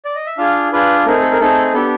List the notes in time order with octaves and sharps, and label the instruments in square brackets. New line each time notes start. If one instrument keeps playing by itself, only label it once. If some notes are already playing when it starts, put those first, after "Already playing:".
[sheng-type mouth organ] D5
D#5
E5
D4 F4 G#4 F5
D4 F4 G#4 B4
A3 C4 D#4 G#4 A#4
A4
A#4
A3 C4 D#4 G#4 A4
B3 D4 G4 A4